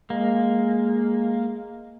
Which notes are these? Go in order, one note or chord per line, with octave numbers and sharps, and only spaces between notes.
G#3 A#3